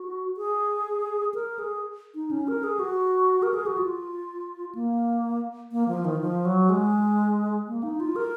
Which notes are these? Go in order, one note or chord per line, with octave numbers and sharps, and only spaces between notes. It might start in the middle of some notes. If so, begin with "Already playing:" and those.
Already playing: F#4
G#4
A#4
G#4
D#4
C#4
A#4
G#4
F#4
A#4
G#4
F#4
F4
A#3
A#3
F3
D#3
F3
F#3
G#3
A#3
D#4
F4
A#4